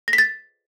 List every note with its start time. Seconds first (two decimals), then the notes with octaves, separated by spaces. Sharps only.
0.08 A#6
0.13 B6
0.18 A6